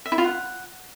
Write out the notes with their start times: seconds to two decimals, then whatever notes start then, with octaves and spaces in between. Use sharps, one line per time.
0.06 E5
0.12 E4
0.18 F4
0.24 F#5